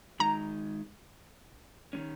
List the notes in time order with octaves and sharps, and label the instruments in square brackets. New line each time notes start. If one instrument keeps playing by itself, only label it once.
[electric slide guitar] D#3 G#3 D#4 [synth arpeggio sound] A#5
[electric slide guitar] D#3 G#3 C#4